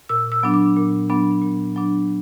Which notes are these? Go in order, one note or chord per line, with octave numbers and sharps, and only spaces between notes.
A#2 E6
E6
F#3 B3 D4
D6
A#2
F#3 B3 D4
A#2
F#3 B3 D4